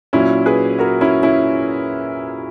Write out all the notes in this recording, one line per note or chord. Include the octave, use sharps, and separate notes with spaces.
A#2 F#3 C#4 E4
G#4 B4
F#4 A#4
C#4 E4
C#4 E4